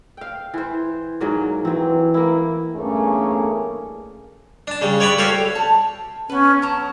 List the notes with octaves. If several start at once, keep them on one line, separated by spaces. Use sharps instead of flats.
F5 G5
E3 C5
G#2 F#3 A#3
E3 F#3 C4
A#3 E4
E2 G2 A3 A#3 C#4 G#4
D4 A5
C#3 G3
C#5 D5 F#5 B5
F#4 G4 A4 C#5 F5
A5
B3 C#4 B4
F#3 A5 A#5